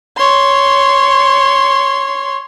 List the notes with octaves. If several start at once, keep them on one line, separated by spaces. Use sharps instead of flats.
C#5 C6